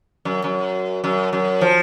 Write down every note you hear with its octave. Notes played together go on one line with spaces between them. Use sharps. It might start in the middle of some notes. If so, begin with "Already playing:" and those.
F#2
F#2
F#2
F#2
F3